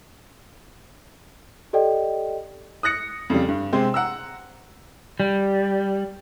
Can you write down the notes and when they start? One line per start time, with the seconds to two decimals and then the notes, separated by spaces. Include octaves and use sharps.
1.73 G4 A4 D5 D#5 G5
2.83 D#6 F#6 A#6 C#7
3.30 F2 C#3 G3
3.48 G2
3.73 C3 G#3 C4
3.94 F#5 A#5 E6
5.20 G3